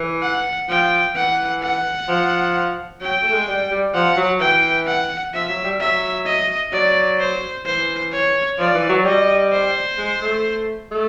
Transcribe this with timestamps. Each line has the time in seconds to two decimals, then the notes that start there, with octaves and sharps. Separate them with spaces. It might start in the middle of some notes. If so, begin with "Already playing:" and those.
Already playing: E3
0.22 F#5
0.69 F3 G5
1.15 E3 F#5
1.62 F#5
2.08 F3
3.01 F#3 G5
3.23 A3
3.32 G#3
3.48 G3
3.71 G3
3.94 F3 F#5
4.17 F#3
4.40 E3 G5
4.87 F#5
5.33 F3 E5
5.49 F#3
5.64 G3
5.80 F#3 E5
6.26 D#5
6.73 F#3 D5
7.19 C5
7.66 E3 C5
8.12 C#5
8.59 F3 D5
8.74 E3
8.89 F#3
9.05 G3 D#5
9.52 C5
9.98 G#3
10.21 A3
10.92 A3